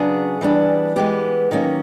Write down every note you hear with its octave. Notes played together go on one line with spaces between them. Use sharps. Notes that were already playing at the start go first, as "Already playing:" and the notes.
Already playing: C#3 F#3 B3 D4 G#4
E3 G3 B3 D4
E3 G#3 B3 G4
D#3 F#3 A#3 C#4